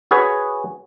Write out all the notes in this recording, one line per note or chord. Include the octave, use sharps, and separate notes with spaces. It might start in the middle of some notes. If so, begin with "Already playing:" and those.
F#4 G#4 B4 C#5